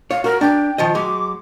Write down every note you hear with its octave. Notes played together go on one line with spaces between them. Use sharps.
C#5 F5
F#4 A#4
D4 G5
D#3 F3 D#5
F#3 G#3 D6